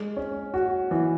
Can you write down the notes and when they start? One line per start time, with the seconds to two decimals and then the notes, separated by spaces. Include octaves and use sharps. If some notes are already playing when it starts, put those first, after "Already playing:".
Already playing: G#3
0.17 C#4
0.54 F#4
0.91 E3